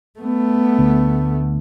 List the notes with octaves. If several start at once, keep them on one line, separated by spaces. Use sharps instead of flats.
A3 B3
D2